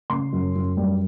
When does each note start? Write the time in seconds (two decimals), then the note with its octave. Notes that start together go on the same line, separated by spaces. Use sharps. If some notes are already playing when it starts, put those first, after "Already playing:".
0.10 C#3 C6
0.33 F#2
0.55 F#2
0.77 G3